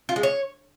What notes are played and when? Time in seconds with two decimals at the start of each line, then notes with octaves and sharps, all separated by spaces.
0.09 F4
0.16 G#3
0.23 C#5